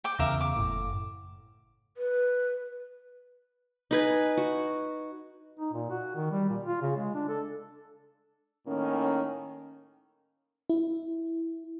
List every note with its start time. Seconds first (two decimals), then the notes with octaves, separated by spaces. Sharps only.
0.04 G5 D6
0.19 E2 C#3 A#4 E5 F5
0.41 D6
0.56 F#1 A2
1.97 B4
3.91 D#4 B4 G#5
4.37 F#4
5.59 D#4
5.73 A#2
5.90 F#4
6.15 D#3
6.31 G3
6.49 A#2
6.63 F4
6.82 C#3
6.96 G#3
7.15 D4
7.29 A4
8.67 A2 D#3 A#3 C#4
10.70 E4